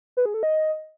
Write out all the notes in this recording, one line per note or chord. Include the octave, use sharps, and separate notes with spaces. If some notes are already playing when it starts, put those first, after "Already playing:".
B4
G#4
A4
D#5